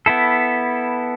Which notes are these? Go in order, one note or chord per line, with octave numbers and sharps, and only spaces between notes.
B3 E4 A4